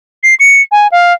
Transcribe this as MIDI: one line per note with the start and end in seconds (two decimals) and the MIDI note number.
0.23 0.35 96
0.40 0.61 97
0.72 0.87 80
0.92 1.13 77